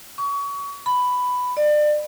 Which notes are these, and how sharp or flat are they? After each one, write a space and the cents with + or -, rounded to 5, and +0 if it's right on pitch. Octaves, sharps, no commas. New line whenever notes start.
C#6 +30
B5 +10
D5 +30